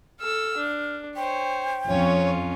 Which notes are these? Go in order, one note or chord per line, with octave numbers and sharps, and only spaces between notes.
A4 E6 F6
D4
C5 C#5 G5
F2 C#4 F4 C#5